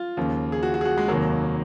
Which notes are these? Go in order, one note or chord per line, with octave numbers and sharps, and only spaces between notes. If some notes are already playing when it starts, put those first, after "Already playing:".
Already playing: F4
D#2 C#3 F3 A#3
G#4
F#4
F#4
G#4
F#4
G#3
F1 D#2 D#3 F#3 A#3